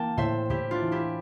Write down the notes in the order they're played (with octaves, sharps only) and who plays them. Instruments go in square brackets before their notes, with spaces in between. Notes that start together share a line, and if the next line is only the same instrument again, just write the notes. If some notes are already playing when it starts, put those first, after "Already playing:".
Already playing: [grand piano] E3 A#3 [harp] G5 A5
[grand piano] A2 [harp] C5 E5
[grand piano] A2 [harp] E4 G4
[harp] D4 F4
[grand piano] E3
[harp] E4 G4